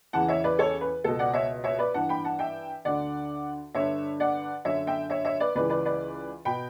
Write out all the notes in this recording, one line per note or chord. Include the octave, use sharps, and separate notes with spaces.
E2 C#3 E3 F#5 A5
C#5 E5
B4 D5
A4 C#5
B4
C#2 B2 A4
D5 F#5
C#5 E5
C#5 E5
B4 D5
G2 E3 F#5 A5
G5 B5
F#5 A5
E5 G5
D2 D3 D5 F#5
G2 D3 C#5 E5
D5 F#5
F#2 D3 C#5 E5
E5 G5
C#5 E5
C#5 E5
B4 D5
C#2 C#3 E3 B4 D5
B4 D5
B4 D5
B2 G5 B5